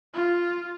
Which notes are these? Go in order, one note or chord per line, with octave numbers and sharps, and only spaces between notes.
F4